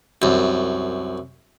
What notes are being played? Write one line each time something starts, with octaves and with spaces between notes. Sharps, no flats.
C2 F#2